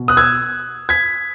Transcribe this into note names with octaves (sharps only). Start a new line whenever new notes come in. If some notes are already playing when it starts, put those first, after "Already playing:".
Already playing: B2
D#6 F#6
E6 G#6
G#6 B6